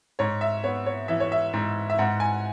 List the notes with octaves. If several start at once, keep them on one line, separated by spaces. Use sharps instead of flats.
G#2 C#5
E5
B3 C#5
C#5
E3 E5
C#5
E5
G#2
E5
G#2 F#5
G#5